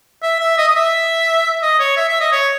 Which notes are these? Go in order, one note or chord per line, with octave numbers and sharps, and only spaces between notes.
E5
E5
D#5
D#5
E5
D#5
C#5
E5
E5
D#5
C#5